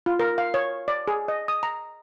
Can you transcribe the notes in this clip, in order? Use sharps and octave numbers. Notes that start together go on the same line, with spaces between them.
F4
A#4
F5
C#5
D5
G#4
D#5
D#6
A#5